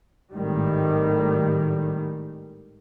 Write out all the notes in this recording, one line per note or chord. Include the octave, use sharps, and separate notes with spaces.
G#1 A2 D#3 G3